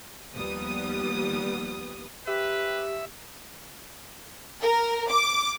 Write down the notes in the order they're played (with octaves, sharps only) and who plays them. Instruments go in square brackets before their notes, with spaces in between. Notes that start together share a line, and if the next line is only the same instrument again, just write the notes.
[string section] D#2 F3 G3 B3 D#6
[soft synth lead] G4 [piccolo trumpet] B4 [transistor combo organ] E5
[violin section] A#4
D6